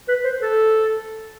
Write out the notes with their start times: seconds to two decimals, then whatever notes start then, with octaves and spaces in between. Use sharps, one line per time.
0.08 B4
0.24 C5
0.41 A4